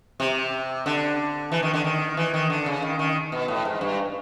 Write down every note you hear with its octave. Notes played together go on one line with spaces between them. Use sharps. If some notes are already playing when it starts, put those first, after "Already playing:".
C3
D3
E3
D#3
D3
D#3
E3
D#3
D3
C#3
D#3
D#3
B2
A2
G#2
G2